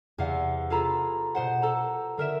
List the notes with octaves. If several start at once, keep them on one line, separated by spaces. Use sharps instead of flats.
E2 C3 F5 F#5
F4 G#4 A4 A#5 B5
B2 C5 F#5
A4 A#5
D3 A#4 E5 E7